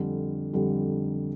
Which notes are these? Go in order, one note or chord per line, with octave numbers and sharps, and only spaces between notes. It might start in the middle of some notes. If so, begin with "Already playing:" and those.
Already playing: F2 D3 G3
F2 D3 G3